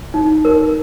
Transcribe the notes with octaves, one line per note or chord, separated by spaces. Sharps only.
D#4
A#4